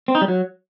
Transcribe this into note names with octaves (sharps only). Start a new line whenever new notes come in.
C4
D#4
G3
F#3